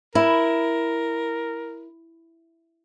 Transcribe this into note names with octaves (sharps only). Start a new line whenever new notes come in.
E4 A#4